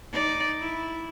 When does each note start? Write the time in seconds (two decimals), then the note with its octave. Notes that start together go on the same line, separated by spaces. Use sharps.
0.12 D#4 D5
0.61 E4